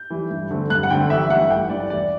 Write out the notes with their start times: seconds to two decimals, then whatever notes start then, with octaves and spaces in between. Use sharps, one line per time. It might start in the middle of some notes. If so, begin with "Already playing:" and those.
Already playing: G6
0.10 E3 G3
0.31 G2
0.51 D3 A3 C4
0.70 G2 F#6
0.83 F#5
0.90 D3 A3 C4 G5
1.10 A1 E5
1.30 G2 E3 A3 F#5
1.50 A1 G5
1.70 G2 E3 A3 D5
1.80 D5
1.90 E1 D5